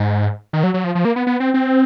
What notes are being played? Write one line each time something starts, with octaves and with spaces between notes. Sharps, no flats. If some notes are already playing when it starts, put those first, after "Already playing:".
Already playing: G#2
D#3
F#3
F#3
F3
F3
A#3
B3
B3
C4
C4